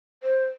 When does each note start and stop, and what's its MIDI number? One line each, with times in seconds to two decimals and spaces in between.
0.23 0.45 72